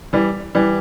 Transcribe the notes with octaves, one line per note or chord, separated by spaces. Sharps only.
E3 G3
E3 G3